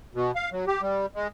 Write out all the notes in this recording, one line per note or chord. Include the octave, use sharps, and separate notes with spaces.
B2
F5
F#3
G4
G3
G#3